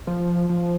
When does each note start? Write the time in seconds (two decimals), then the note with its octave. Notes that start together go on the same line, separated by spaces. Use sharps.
0.07 F3
0.49 F3